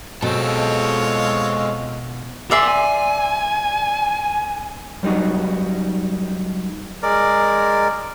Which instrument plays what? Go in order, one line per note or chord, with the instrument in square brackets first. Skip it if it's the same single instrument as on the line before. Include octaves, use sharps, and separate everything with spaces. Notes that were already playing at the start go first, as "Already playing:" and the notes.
[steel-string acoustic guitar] B2 [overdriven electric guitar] G#3 A4 [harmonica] C4 F4 C#5
[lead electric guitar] A#4 G#5 [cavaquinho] D5 E5 C6
[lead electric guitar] G#5
[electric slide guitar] F#2 G3 A3 D#4 F#4
[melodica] G#3 A#4 D5